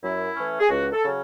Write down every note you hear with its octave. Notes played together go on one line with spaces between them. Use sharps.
F#2 E4
E3 A3 C#4
G#4
C#2 F#4
A4
C#3 F#3 C#4